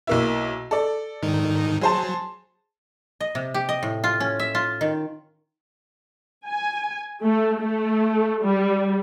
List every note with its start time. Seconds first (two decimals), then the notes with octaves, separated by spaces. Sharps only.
0.07 B1 A#3 E4
0.71 A4 D5
1.23 G#2 D#3 D#4
1.81 F#3 G#4 C5 A5
3.20 D#5
3.35 C3
3.54 G4
3.69 D#5
3.83 A2
4.04 F4
4.20 C#4
4.39 E5
4.55 F4
4.81 D#3
6.47 G#5
7.22 A3
7.59 A3
8.42 G3